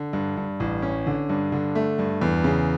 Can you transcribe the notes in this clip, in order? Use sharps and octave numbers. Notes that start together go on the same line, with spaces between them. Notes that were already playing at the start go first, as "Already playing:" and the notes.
Already playing: D3
G2
G2
A1
C#4
D3
G2
D3
A3
G2
E2
C#3